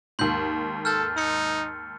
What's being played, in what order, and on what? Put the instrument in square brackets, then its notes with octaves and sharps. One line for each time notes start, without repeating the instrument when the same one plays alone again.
[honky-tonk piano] D#2 G#2 [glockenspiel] C6 G6
[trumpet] A4 [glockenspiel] F6 G6 A6
[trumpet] D#4 [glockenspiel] E6 C#7